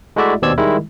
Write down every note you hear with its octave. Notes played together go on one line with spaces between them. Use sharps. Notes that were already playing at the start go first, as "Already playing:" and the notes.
G#3 A3 E4 F#4 D5 E5
D#2 B2 C4 D5 E6 G#6
D#3 G3 G#3 E4